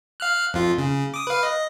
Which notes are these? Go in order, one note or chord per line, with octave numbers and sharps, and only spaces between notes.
F5 F6 F#6
F2 F4
C#3
D6 D#6
B4 F5
D#5